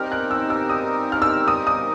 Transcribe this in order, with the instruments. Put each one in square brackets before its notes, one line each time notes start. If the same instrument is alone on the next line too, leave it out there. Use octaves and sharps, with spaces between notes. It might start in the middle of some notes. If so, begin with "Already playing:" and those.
Already playing: [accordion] G3 C4 D#4 G4 A#4 [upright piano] F6
[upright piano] F#6
E6
E6
D#6
F6
E6
D#6
D#6